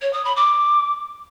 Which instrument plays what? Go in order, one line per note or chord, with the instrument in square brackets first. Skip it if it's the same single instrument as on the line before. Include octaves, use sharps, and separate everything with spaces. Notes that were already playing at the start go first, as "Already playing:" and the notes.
[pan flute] C#5
D#6
B5
D6